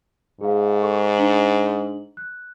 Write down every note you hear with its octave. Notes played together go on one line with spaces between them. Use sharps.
G#2 G#4 F5
A4 C#6
D4 F#7
F#6